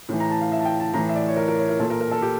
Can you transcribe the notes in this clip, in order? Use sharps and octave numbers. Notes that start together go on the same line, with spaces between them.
A2 E3
A#5
A5
F5
E5
A5
G5
A5
A2 E3 A#5
E5
D5
C#5
A#4
A#4
C#5
A#4
A#2 A4
A#4
A#4
A4
G4